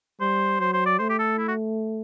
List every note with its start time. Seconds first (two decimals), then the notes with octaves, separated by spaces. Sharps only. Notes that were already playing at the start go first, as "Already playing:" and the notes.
0.21 G3 C5
0.60 F#3 C5
0.73 C5
0.86 D5
0.99 A3 C5
1.09 G4
1.18 A4
1.38 E4
1.48 F#4